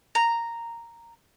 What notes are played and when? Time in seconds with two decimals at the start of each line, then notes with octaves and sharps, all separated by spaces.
0.15 A#5